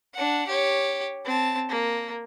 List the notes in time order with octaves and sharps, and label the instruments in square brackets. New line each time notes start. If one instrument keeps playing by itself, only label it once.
[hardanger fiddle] D4 F#5
G4 C#5
C4 A5
A#3